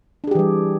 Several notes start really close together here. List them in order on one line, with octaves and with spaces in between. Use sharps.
D4 G#4 G4 E3 G3